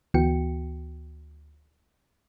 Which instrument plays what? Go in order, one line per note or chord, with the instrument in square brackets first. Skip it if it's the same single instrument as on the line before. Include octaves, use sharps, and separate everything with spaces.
[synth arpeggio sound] D2 E3 B3 F#4 G5 C#7